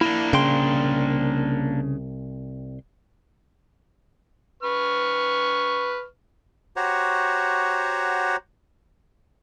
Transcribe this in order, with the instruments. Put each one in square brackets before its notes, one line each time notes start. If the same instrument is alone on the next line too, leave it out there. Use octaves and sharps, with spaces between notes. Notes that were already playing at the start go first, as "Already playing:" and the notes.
[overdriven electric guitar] A#3 D4 [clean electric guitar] E4
[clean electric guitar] C2 G5 C6 [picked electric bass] C#3
[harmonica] B4 C#6 F6
[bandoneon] F#4 G4 C5 C#5 F#5 A#5